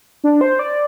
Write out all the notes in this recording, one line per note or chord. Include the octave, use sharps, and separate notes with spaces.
D4
C5
D5